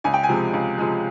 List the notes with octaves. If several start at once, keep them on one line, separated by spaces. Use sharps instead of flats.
C#2 G#5
G5
G#5
C3 F3 G#3
C#2
C3 F3 G#3